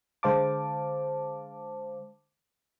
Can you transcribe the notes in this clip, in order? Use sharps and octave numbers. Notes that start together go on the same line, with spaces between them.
D3 G#3 C5 F5 A5 D6